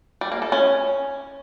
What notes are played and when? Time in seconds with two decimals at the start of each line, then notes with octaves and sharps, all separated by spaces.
0.21 G3
0.32 A#3
0.42 A4
0.52 C#4